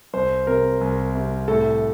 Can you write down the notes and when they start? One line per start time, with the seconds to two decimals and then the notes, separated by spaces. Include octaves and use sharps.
0.13 C2 C5
0.47 C3 A#4
0.81 C2
1.15 C3
1.48 A2 A4